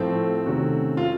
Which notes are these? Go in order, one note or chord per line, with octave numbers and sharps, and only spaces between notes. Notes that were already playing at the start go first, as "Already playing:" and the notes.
Already playing: A2 F3 A3 C4
C3 D#3 A3 C#4 F#4
F4